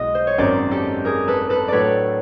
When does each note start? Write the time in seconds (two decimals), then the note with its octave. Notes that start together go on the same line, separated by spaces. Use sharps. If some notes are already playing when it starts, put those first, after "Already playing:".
Already playing: B1 B2 G#3 E4 D#5
0.15 C5
0.27 C#5
0.38 G#1 F#2 D#3 C5 D5
0.71 G4 A4
1.05 G#4 A#4
1.28 A4 B4
1.50 A4 B4
1.68 A2 F#3 A3 D4 B4 C#5 D5